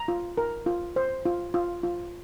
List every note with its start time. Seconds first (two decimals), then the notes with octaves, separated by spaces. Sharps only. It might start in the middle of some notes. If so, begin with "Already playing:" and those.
Already playing: A#5
0.08 F4
0.37 A#4
0.66 F4
0.96 C5
1.25 F4
1.54 F4
1.83 F4